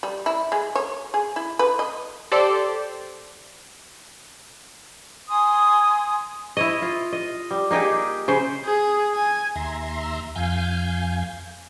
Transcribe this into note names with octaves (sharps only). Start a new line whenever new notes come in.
G3
E4
G#3
C#5
G#4
E4
B4
D#5
G4 A4 C5 D5
G#5 C6 D#6
E4 C#5 D#5
F4
D#5
G3
A#3 D#4 G4 G#4
C#3 C5
G#4
G#5
D#2 E5 A#5 C6
F2 F5 G#5 G6